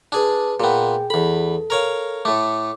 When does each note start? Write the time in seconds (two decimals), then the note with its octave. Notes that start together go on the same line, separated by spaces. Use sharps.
0.12 D4 G#4 B4 A5
0.60 A#2 B3 G#4 G5
1.10 E2 A4 B5
1.70 A#4 C#5 F5
2.25 A2 A3 D6